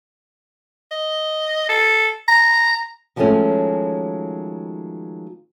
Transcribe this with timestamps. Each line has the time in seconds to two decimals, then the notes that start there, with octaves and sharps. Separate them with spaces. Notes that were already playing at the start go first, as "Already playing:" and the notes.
0.91 D#5
1.69 A4
2.28 A#5
3.16 D#3 F3 F#3 G#3 A3 C#4